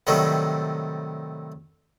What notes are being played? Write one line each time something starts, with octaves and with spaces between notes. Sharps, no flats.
A2 C3 D#3 F#3 G3 A3